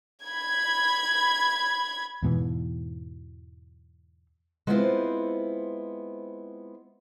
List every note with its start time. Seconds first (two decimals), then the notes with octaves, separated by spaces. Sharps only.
0.24 B5 G#6
2.23 E2 G#2 B2 E3
4.67 G#3 B3 C4 E4 F4 C5